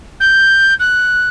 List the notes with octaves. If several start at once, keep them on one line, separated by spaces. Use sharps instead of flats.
G6
F#6